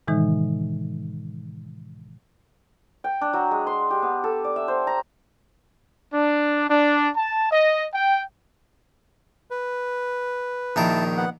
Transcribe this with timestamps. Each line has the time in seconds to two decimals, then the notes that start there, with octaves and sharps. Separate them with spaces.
0.08 A2 C3 D#3 E3 G#3 D#4
3.04 G5
3.21 D4
3.33 F#3
3.51 G#3
3.67 C6
3.90 G4
4.02 B3
4.24 A4
4.44 D5
4.56 E5
4.68 C5
4.87 A#5
6.14 D4
6.69 D4
7.17 A5
7.52 D#5
7.95 G5
9.50 B4
10.76 A#1 D#3 E4 A#4 A5
11.17 B3 F#5